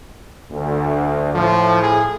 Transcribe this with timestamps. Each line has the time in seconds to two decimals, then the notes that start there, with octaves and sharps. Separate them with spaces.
0.51 D2
1.35 A2 F3
1.82 G#4